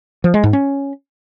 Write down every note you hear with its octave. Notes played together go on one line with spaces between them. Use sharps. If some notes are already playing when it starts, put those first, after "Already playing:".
F3
G#3
G#2
C#4